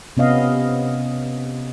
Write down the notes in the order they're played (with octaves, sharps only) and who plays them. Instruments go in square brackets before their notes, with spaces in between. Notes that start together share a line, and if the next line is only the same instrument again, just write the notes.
[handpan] C3 B3 C#4 D#5 F5